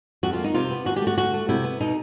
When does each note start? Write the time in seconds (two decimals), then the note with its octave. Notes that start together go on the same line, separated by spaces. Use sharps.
0.23 F2 F#4
0.33 F4
0.38 A#3
0.44 D#4
0.54 C3 F4
0.70 B3
0.85 D#2 F#4
0.96 G4
1.02 A3
1.07 F#4
1.17 D2 F#4
1.34 A3
1.49 C3 E4
1.64 B3
1.80 B2 D#4